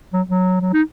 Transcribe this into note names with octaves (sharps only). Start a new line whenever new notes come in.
F#3
F#3
F#3
D#4